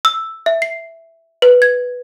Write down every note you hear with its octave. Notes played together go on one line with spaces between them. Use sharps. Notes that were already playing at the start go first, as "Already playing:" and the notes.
E6
E5
C7
B4
G#6